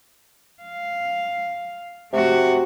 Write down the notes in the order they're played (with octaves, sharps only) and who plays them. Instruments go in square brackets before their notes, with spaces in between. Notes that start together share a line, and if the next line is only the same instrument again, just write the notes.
[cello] F5
[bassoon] C3 [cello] A3 F#4